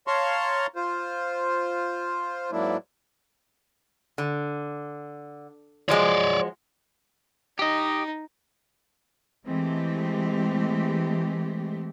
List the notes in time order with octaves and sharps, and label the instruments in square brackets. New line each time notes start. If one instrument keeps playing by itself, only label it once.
[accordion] C#5 F5 A5 A#5 C6 C#6
F4 C5
G#2 F#3 A#3 D4 E4
[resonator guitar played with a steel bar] D3
[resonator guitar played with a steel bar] F3 F#3 G#3 [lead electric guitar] C#5 D5
[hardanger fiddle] D#4 [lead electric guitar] G4 D#5
[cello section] E3 G#3 A3 C4 G4